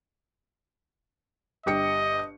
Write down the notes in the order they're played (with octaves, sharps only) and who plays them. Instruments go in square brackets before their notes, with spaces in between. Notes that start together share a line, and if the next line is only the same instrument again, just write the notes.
[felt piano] G1 G4 C#7 [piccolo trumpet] D#5